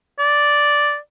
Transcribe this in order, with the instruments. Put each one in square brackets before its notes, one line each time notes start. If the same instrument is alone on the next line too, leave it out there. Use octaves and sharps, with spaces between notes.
[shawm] D5